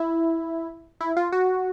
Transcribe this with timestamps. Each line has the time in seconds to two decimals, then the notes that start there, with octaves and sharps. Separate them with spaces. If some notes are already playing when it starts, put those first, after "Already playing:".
Already playing: E4
1.01 E4
1.17 F4
1.32 F#4